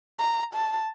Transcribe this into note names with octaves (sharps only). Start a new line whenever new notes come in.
A#5
A5